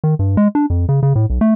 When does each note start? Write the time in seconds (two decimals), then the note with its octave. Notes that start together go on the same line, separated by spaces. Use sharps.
0.04 D#3
0.19 G2
0.37 G#3
0.55 D4
0.70 F2
0.89 C#3
1.03 C#3
1.16 A2
1.30 B1
1.41 A3